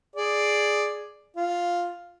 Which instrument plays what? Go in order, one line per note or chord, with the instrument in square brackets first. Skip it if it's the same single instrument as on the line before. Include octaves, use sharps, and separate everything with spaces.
[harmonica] G#4 D5
F4